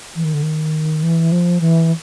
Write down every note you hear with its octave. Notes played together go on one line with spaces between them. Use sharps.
E3
D#3
D3
D#3
E3
F3
E3